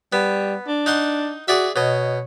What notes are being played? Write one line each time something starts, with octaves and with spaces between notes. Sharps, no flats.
G3 B3
D4
D#4 F#5 C6
F#4 G#4 D5 E5
B2 C#5 D#5